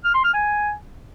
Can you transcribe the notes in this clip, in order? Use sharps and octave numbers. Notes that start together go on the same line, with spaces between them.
F6
C6
F6
G#5